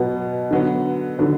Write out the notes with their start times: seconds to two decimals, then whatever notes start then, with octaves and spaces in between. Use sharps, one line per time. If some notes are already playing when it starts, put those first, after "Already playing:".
Already playing: B2 F#3 B3
0.51 D3 F#3 B3
1.19 D3 F#3 B3